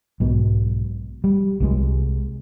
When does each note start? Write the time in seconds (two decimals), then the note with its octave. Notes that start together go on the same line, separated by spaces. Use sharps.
0.20 B1 G#2 B2
1.24 G3
1.60 C2 C3 F#3 G#3